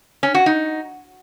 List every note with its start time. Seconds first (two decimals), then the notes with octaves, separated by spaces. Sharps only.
0.23 C#4
0.35 F#4
0.46 D#4